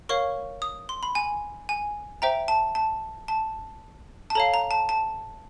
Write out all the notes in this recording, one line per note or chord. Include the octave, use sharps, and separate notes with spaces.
A#4 C#5 F5 C#6
D#6
C6
B5
G#5
G#5
C5 E5 G5 A#5
A5
A5
A5
A5
A4 C#5 F5 A#5
A#5
A5
A5